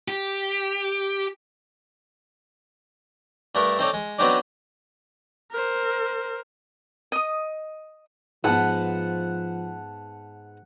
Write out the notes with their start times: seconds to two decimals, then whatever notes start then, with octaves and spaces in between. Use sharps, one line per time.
0.08 G4
3.55 G2 A3 D4 A#4
3.79 C4 D#4 A4 C#5 D5 A5
3.93 G#3
4.19 F#3 B3 C4 D4 D#4 D5
5.52 A#4 C5
7.12 D#5 D#6
8.44 G#2 F3 B3 F#5 A5